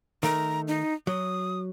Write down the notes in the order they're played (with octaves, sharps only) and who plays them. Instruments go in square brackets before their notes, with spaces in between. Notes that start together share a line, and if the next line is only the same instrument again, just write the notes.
[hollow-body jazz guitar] D#3 A3 [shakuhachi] A#5
[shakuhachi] D#4
[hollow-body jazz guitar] F#3 [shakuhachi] D#6